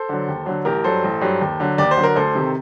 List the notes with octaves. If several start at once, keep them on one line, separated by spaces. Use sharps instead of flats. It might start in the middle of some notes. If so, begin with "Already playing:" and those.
Already playing: A4 C5
D3 F#3
D#2
D3 F#3
A1 G4 A#4
G2 F#3 A4 C5
A1
G2 F#3
D#2
D3 F#3
D#2 D5
C5
D3 F#3
A#4
D2 A4 C5
C3 D#3